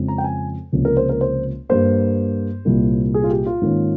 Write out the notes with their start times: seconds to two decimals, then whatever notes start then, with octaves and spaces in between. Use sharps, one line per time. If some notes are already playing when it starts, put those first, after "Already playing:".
Already playing: F2 C#3 F3 G#3 C4
0.08 A#5
0.18 G5
0.24 G#5
0.72 C#2 C3 F3 A#3 C#4
0.85 A#4
0.97 C5
1.09 A#4
1.21 C5
1.69 G2 G3 A#3 C5
2.65 C2 A#2 G3 A#3
3.14 G#4
3.24 F4
3.30 G4
3.46 F4
3.62 G#2 D#3 A#3 C#4